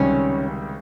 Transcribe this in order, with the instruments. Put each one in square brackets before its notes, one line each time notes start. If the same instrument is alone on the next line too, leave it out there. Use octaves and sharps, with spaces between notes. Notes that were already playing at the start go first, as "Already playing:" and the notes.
Already playing: [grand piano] C#2 C3 D#3 G3 [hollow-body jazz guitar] C#4